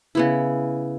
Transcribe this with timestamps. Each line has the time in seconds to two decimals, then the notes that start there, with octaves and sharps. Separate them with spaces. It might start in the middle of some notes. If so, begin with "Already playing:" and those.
0.15 C#3 B3 E4